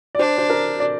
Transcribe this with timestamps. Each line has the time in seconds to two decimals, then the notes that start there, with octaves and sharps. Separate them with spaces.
0.15 D5
0.19 D4 C5
0.38 C5
0.50 A#4
0.80 D5